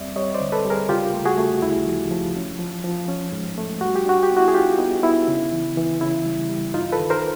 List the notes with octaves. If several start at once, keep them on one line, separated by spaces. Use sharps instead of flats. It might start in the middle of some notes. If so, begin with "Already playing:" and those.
Already playing: D#2 G3 C4 D5 E5
G3 C#5 D#5
C5 D5
D3
A4 B4
G3
G#4 A#4
C#3 F4 G4
A3
F#4 G#4
A3
D2 E4
F3
F3
C#4
F3
F3
C#4
G#2
A3
G3 F#4
G4
D4 F#4
G4
B3
E4 F#4
G#4
D4 F4 G4
B3 D#4
B3 E4
C#3
E3
E3
C#3 E4
G3
G3
G2 D#4 F4
A4 B4
D#3
A#4 C5